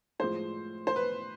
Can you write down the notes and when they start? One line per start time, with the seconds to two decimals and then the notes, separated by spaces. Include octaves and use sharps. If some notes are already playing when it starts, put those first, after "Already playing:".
0.19 A2 F3 G#3 C5
0.87 C5
0.96 B4